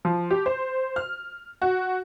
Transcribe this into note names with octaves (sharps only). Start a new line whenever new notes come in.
F3
G4
C5
F6
F#4